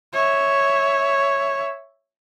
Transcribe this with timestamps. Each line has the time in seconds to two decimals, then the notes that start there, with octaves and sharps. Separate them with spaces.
0.13 C#5 E5